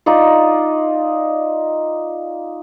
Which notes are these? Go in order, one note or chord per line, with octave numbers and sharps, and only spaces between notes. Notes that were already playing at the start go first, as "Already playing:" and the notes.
D#4 F4 D5 D#5